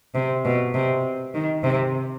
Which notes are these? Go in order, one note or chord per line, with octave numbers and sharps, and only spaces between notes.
C3
B2
C3
D#3
C3